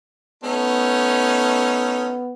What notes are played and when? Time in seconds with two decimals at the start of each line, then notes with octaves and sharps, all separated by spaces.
0.44 A3 B3 C#4 D#4